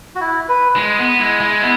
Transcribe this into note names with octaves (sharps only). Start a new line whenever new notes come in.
F#4
E4
B4
G#3
B3
G#3 E4
G#3
B3 E4